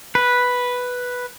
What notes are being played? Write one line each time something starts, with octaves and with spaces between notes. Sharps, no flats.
B4